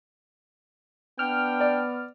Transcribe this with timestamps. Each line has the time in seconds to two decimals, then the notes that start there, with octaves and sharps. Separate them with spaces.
1.19 B3 D4 G5 F6
1.60 D5